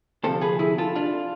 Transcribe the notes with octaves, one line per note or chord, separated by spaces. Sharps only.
D2 C3 F3 A4 C5
G#4 B4
E4 G#4
F4 A4
D4 F4